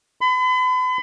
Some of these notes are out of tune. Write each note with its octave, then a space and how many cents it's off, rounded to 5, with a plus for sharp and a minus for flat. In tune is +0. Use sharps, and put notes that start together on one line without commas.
B5 +40